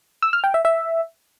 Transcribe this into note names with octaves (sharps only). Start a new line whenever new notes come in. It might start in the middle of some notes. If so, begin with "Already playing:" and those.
E6
F6
G5
E5
E5